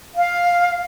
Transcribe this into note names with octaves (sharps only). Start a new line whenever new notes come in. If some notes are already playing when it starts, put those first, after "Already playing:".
F5